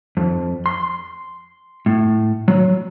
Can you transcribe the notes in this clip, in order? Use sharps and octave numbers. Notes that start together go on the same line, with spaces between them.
F2
C6
A2
F#3